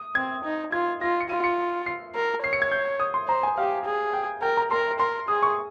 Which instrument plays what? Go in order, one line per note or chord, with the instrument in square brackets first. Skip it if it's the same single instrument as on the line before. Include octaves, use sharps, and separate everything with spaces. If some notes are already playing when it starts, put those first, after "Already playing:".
Already playing: [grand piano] D#6
[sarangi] C4 [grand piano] G#6
[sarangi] D#4
[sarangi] F4 [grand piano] G#6
[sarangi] F4 [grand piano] A#6
[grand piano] C#7
[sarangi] F4 [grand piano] D#7
[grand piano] C#7
C7
[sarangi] A#4
[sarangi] C#5 [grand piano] C7
[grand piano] C#7
G#6
G6
D#6
C6
[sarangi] C5 [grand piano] A#5
[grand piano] G#5
[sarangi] G4 [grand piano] F5
[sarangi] G#4
[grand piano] G5
[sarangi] A#4 [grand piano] G5
[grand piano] A#5
[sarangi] A#4 [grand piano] C6
[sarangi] A#4 [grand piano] C6
[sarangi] G#4 [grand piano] D#6
[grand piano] C#6